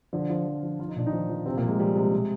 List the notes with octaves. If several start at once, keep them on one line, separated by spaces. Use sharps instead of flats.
D3 F3 D4
F3 F4
F3
F3
F3 F4
D#4
A#2 D4
D#3 D#4
F3
F3
C3 C4
A#2 A#3
F3
G#3
F3 G3
C3 G#3
C3